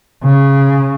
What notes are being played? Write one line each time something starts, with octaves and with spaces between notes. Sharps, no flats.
C#3